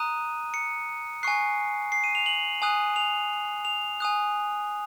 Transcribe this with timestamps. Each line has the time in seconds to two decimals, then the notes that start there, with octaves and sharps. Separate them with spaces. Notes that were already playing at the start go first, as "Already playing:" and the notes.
Already playing: A#5 D#6 F#6 D#7
0.54 C#7
1.23 G#5 C#6 F#6 C7
1.92 C7
2.04 D#7
2.15 F7
2.26 F#7
2.62 G#5 D#6 F#6
2.96 F7
3.65 F7
4.00 G#5 D#6 F#6